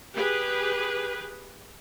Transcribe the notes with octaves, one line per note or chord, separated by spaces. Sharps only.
G4 G#4 B4